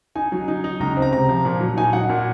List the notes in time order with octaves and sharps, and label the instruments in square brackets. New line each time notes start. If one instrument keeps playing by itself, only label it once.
[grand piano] D#4 G#5
F#3
D#4
D#4
C#2 A#5
C4
A#5
C3 A#5
F3
A#2
F#3
D#4 G#5
F#3 F#5
A#2